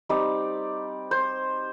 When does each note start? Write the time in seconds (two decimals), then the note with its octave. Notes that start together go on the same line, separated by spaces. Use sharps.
0.09 G3 C4 D#4 D5
1.11 C5